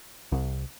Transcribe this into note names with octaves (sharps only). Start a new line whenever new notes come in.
C2